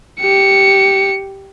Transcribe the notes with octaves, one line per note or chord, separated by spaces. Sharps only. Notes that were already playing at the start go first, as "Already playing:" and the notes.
G4 C#7